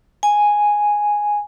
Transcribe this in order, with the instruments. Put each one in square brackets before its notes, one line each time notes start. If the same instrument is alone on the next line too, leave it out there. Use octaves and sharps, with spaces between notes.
[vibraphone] G#5